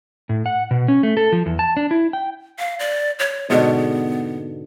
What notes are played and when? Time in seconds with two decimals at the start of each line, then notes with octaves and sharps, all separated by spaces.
0.29 A2
0.46 F#5
0.71 B2
0.88 C#4
1.03 A3
1.17 A4
1.32 F3
1.46 E2
1.59 A5
1.77 D4
1.91 E4
2.13 G5
2.59 F5
2.79 D5
3.19 C#5
3.50 G#2 B2 D3 B3